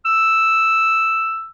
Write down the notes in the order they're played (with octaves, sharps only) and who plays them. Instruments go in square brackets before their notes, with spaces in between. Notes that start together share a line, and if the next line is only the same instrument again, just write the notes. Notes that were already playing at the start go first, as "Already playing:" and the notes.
[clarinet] E6